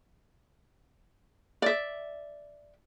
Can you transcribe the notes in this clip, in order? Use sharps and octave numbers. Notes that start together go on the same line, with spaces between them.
D5 E5